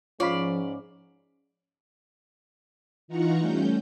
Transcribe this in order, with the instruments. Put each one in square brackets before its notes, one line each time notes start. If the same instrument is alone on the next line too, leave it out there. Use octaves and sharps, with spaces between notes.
[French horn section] G#2 G#3 C#4 [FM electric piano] F3 [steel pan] C#5 F5 B5 [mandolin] D5
[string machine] E3 D#4 F4 F#5 A#5 C#6
G3 A3 C#4 G6